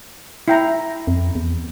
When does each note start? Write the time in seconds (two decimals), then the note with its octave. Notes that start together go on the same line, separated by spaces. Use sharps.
0.48 E4 G5 A#5
1.07 F2
1.35 E2